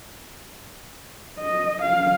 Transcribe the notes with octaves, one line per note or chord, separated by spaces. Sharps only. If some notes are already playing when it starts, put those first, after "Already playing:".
D#5
F5